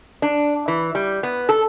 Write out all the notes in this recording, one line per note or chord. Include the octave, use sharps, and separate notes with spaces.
D4
E3
G3
B3
A4